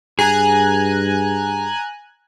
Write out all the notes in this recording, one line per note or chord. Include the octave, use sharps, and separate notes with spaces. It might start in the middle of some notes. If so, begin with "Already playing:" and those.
G2 G#4 G#5 A#5 F#6